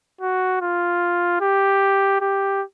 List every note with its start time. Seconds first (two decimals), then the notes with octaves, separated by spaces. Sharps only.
0.21 F#4
0.61 F4
1.41 G4
2.21 G4